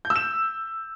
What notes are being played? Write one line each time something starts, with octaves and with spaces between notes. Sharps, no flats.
G6
E6
E7